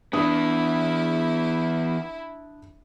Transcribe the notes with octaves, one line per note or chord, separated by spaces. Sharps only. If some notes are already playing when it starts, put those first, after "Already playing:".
E3 B3 D4 E4 D#6